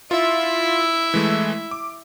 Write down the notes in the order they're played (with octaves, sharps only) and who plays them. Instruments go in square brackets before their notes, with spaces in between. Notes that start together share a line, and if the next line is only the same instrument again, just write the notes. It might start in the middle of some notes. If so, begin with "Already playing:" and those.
[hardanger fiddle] E4 E5 [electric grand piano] F4
[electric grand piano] E3 G#3 A3
D6